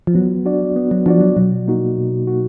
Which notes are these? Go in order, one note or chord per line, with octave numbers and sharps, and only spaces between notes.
F3
F#3 B3
D4 F#4 D5
B3
F#3
F3 D4 F#4 D5
F#3
B2 F#3
A#3 D#4 F#4
B2
A#3 D#4 F#4